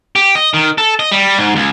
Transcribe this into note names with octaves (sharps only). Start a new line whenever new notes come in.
G4
D#5
D#3
A4
D#5
G3
G#2
C#2